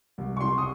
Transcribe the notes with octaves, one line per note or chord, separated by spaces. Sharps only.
C2
C#6
C3 C6
D#6